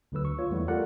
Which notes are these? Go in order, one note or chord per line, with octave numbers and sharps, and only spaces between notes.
D2 D3 F#3 B4 E6
C#6
F4 C#5
E2 G3 A3 B3 E4
F4 G4 A4 A#4 D5 F#5